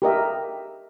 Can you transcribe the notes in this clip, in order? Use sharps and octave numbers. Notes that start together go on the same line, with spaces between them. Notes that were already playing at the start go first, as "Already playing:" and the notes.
G4 A#4 D#5 E5